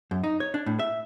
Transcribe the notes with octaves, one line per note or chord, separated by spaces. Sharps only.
F#2
D#4
C#5
D4
A2
E5